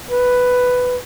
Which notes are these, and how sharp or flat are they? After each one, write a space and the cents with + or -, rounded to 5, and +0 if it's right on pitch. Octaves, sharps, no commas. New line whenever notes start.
B4 +5